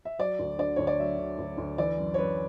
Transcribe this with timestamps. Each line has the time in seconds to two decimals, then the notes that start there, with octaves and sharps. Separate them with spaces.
0.05 E5
0.19 F#3 D5
0.39 D2
0.59 D3 D5
0.76 D2 C#5
0.87 D5
0.99 F#3 E5
1.18 D3
1.39 D2
1.58 D2
1.78 E3 D5
1.98 F#2
2.14 C#5
2.18 F#2 B4